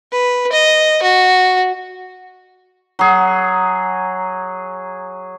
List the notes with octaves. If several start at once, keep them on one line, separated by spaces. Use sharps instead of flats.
B4
D#5
F#4
F#3 G#4